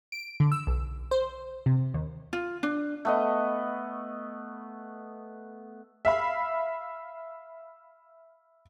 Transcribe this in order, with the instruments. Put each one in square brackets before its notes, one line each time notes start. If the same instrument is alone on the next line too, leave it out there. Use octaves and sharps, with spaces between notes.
[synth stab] D7
D3
E6
B1
C5
C3
D#2
[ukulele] F4
D4
[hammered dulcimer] A3 B3 D#5
[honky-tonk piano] E5 F5 B5